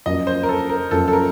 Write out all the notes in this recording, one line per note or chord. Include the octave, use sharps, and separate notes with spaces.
F#2 F3 A#3 C#4 D#5
C5
A#4
A4
A#4
F#2 F3 A#3 C#4 A4
A4
A#4